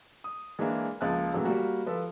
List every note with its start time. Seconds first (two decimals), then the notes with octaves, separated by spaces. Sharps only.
0.24 D#6
0.59 E3 G#3 A#3 D4 G#4
1.01 C#2 F3 A#3 A5 F#6
1.33 A#2 C#3 E3 F#3 A3
1.45 G3 A#3 F#4
1.86 F3 A4 B4